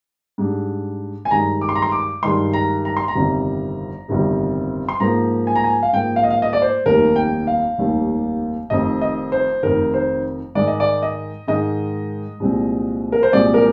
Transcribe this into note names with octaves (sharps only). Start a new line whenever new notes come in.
G#2 G3 D4
G#5
G2 D#3 G#3 D#4 A#5
D6
C6
A#5
C6
D6
G2 D#3 G#3 D#4 C6
A#5
A#5
C6
A#5
G1 F2 C3 D#3 G3
G1 F2 C3 D#3 G3
C6
G#2 F3 A#3 A#5
G#5
A#5
G#5
F5
G#2 F3 A#3 G5
F5
D#5
F5
D#5
D5
C5
F1 D#2 D#3 G3 A#4
G5
F5
F1 D#2 D#3 G3
F1 F2 D#3 D#5
D#5
C5
F1 F2 D#3 A#4
C5
G#2 D#3 G#3 D5
D#5
D5
D#5
G#2 D#3 G#3 D#5
C2 A#2 F3 G#3 C4
A#4
C5
C2 A#2 F3 G#3 C4 D5
A#4